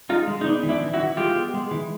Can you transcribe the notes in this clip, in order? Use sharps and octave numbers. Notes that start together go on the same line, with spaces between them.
G#3 D#4 F4
G#3
D#4
B3 D4
E3
D4 E4
E3
E4 F#4
E3
G#3 F4 G4
B3
G#3
E3